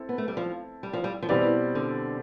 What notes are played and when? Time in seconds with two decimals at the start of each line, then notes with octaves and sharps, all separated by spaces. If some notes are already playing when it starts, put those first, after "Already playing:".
Already playing: C4 E4 A4
0.09 B3
0.18 A3
0.28 G3
0.37 F3
0.83 G3
0.93 F3
1.04 G3
1.22 F3
1.29 B2 E3 G3 C4 G4 D5
1.75 D3